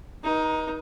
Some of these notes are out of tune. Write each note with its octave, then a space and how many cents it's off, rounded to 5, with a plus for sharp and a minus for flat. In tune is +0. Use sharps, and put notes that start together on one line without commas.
D#4 +10 B4 -45